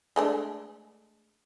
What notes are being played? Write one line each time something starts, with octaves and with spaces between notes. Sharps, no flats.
G#3 A3 D4